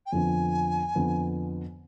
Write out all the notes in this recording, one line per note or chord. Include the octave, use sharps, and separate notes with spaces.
G5
F2 D3 F3 B3 G#5
F2 D3 F3 B3